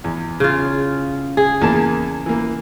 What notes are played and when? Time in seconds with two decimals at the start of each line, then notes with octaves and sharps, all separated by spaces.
0.04 E2
0.40 C#3 F4
1.37 G#4
1.61 E2 A#3 A5
2.26 E3 A#3